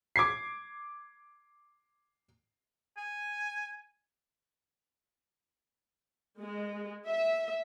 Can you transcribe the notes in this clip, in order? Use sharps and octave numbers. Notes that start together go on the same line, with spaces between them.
D6 G#6 C7
G#5
G#3
E5